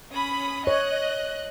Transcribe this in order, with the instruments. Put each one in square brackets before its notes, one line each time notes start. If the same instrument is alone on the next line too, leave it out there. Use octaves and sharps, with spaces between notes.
[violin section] C#4 B5 D#6
[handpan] C#5 [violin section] D#5 F#6